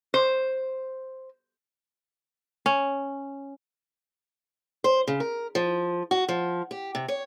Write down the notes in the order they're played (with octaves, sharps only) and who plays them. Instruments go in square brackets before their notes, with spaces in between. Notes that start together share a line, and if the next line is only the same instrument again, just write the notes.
[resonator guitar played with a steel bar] C5
[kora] C#4
[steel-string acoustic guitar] C5
C#3
A#4
F3
F#4
F3
G4
C3
C#5